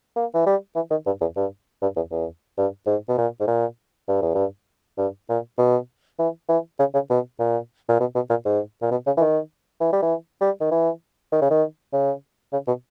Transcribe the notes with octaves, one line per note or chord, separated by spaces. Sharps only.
A#3
E3
G3
E3
D#3
G2
E2
G2
G2
E2
E2
G2
G#2
B2
A#2
G#2
A#2
G2
E2
G2
G2
A#2
B2
E3
E3
C#3
C#3
B2
A#2
A#2
B2
B2
A#2
G#2
A#2
B2
C#3
E3
D#3
E3
G3
E3
G3
D#3
E3
D#3
C#3
D#3
C#3
C#3
B2